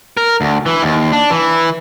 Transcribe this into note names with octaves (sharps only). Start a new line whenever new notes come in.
A#4
D2
E3
D#2
D4
E3